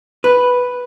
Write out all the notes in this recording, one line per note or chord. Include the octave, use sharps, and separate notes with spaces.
B4